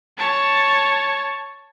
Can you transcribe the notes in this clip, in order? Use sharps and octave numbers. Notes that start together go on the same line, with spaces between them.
C#5 A5